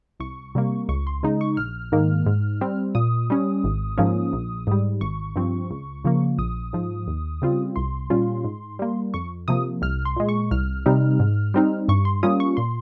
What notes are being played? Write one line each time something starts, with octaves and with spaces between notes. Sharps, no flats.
C2 C#6
C3 G3 A#3
C#2 C#6
C6
C#3 G#3 D#4
C#6
A#1 F6
G#2 D#3 A#3
G#2
G3 C4
A#2 D#6
G3 C#4
G#1
G#2 F3 A#3 C#4
A#1
G#2 G3
G#1 C#6
G2 F3 C4
C#2
C#3 F3 A#3
A#1 D#6
G#2 F3
D#2
C#3 G3 C4 F4
C2 C6
A#2 G3 C#4 F4
G#2
G3 A#3
F2 C#6
C3 F3 A#3 D#6
C2 F6
C6
A#2 G#3
C#6
C2 F6
C3 G3 C4 D#4
G#2
G3 C4 D#4
G2 C#6
C6
G3 A#3 C#4 F4 D#6
C#6
A#2 C6